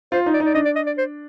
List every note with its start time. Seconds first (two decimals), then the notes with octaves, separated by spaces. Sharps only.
0.12 F4 C5
0.26 D#4
0.34 D5
0.40 D#4
0.45 D5
0.54 D4 D#5
0.65 D5
0.76 D#5
0.87 D5
0.98 C5